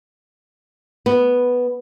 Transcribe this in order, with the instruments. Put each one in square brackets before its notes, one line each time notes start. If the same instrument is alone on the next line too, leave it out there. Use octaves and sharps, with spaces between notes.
[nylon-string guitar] B3